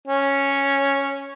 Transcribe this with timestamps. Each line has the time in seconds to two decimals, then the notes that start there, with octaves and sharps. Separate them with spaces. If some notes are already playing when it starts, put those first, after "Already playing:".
0.07 C#4